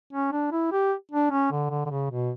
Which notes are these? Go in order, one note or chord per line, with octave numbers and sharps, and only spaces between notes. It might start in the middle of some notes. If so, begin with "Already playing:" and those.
C#4
D4
E4
G4
D4
C#4
D3
D3
D3
C#3
B2